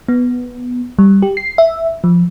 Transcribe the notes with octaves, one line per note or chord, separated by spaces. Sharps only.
B3
G3
G4
C7
E5
F3